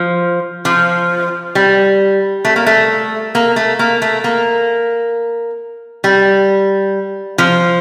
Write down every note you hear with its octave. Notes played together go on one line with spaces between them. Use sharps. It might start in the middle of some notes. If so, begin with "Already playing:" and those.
Already playing: F3
F3
G3
A3
A#3
A3
A#3
A3
A#3
A3
A#3
G3
F3